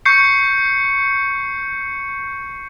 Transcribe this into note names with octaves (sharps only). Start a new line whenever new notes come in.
C#6 G6 C7 C#7